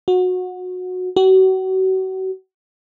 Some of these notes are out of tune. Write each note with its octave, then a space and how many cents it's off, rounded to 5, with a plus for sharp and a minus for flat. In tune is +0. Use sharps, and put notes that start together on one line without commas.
F#4 -20
F#4 +35